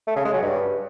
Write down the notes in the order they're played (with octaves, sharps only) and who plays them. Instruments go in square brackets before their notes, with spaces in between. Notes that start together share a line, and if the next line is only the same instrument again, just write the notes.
[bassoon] A3
C#3
G#3
F#3
G2